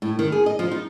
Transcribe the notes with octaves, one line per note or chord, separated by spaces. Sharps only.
A2
D#3
G#4
D#5
F3
D#4